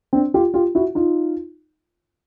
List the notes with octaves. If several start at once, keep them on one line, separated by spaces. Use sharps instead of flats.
C4 D4
F4 G4
F4 G4
E4 F#4
D#4 F4